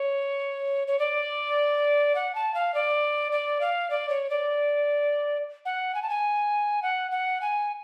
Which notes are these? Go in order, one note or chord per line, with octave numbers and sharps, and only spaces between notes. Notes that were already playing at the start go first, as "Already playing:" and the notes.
Already playing: C#5
C#5
D5
F#5
A5
F5
D5
D5
F5
D5
C#5
D5
F#5
G#5
A5
G#5
F#5
F#5
G#5